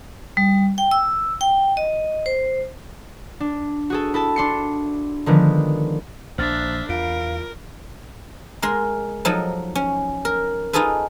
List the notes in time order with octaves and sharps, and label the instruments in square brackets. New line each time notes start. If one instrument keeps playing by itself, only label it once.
[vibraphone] G3
G5
E6
G5
D#5
C5
[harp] D4
F#4 G#4 A4
E4 A4 A5
D4 C6 C#7
D3 D#3 F3 G#3 B3
[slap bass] A#1 [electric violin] D4 E5 [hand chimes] C5 F6 A6
[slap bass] E2 [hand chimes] F4 D7 [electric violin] A#4 [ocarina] F5
[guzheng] G#3 A#4 C6
F3 F#3 D#4 A4
C#4
A#4
D#4 F4 G#4 A4 B4